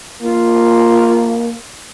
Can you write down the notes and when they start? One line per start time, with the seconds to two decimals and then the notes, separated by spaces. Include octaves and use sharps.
0.22 A#3 F4